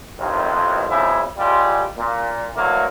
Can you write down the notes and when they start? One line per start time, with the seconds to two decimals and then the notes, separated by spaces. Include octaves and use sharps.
0.19 A1 F2 D#3
0.89 B1 F2 G#2 C#3 F3 E4
1.38 A1 G3 G#3 F4
1.98 A#2
2.55 D3 E3 F#3 A3 A#3